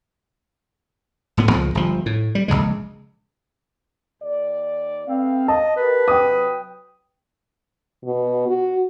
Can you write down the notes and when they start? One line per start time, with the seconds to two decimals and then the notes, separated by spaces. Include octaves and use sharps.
1.37 D#1 A2 B3
1.51 C#2 A#2 F3
1.75 G1 F3
2.06 A2
2.35 G3
2.48 A#1 E2 C#3 G#3
4.22 D#2 D5
5.07 A3 B3 C4 F5
5.48 D#5 A5
5.77 G4 A#4 B4
6.08 C3 F#3 G5 D#6
8.04 B2
8.49 F#4